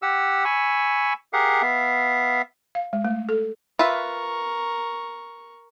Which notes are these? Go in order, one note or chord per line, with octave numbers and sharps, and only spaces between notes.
G4 F#5 E6
G#5 B5 C#6 E6
G4 G#4 A#4 F5 F#5
B3 E5 F5
F5
G#3
A3
A4
F4 A#4 B4 E5 C#6